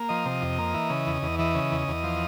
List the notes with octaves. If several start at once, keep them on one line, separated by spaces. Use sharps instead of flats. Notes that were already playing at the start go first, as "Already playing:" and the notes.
Already playing: A#3
F3 D#5
C3
F2
A#3
E3
C#3
E2
E2
E3 D#5
C#3
E2
E2
F3